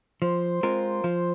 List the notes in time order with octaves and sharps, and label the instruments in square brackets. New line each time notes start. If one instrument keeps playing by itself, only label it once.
[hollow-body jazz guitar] F3 [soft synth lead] C5
[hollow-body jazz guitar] G#3 C4 F4 A#4
F3